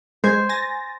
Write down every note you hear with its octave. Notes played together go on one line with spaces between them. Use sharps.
G#3 C5 G#6
G#5 A6 A#6